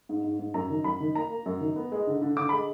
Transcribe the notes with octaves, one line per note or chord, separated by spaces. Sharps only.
G#2
G#2
G#2
F#2 A#5
D#3
F#2 B5
D#3
A#3 A#5
A#3
F#2
D#3
B3
G#3
D3
D3
D3 D6
G#3 B5